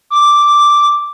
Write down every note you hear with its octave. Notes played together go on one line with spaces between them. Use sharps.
D6